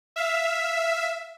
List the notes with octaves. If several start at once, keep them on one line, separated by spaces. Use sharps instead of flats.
E5 F5